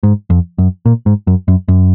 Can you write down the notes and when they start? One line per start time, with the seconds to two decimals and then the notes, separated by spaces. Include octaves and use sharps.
0.03 G#2
0.30 F2
0.58 F#2
0.86 A#2
1.06 G#2
1.27 F#2
1.48 F#2
1.68 F#2